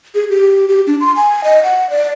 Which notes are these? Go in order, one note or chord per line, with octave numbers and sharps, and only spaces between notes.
G#4
G4
G4
D4
C6
G#5
D#5
F#5
D5